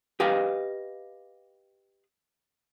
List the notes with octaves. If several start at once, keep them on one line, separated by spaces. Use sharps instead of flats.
G4 B4 D#5 F5